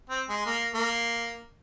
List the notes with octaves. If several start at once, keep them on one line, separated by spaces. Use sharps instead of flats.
C4
G#3
A#3
A#3